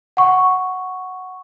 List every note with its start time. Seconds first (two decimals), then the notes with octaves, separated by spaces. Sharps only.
0.17 F#5 C#6